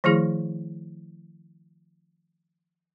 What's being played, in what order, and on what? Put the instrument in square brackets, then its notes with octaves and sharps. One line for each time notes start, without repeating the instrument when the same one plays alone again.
[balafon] D#3 F3 A3 E4 G#4